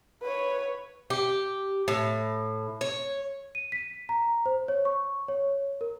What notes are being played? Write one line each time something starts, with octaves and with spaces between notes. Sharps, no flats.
B4 C#5
G4
A2
C#5
D#7
B6
A#5
C5
C#5
C#6
C#5
A#4